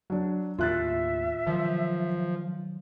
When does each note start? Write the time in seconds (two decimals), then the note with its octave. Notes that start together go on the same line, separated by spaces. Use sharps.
0.10 F#3 D4
0.59 D#2 A2 F4 E5 F#6 A6
1.47 D#3 F3 F#3